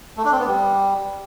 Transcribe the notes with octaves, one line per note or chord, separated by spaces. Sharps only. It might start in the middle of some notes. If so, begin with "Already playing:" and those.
A3
D4
C4
B3
G3